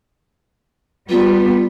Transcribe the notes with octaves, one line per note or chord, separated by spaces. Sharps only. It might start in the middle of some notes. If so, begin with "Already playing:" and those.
G3 B3 F4